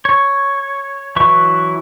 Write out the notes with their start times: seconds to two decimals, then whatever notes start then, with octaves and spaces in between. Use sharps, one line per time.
0.05 C#5
1.16 E3 F#3 E4 B4 C#6